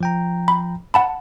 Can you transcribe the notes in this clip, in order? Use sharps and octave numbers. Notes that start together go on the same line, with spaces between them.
F3 G5 A#5
B5
F#5 A5 B5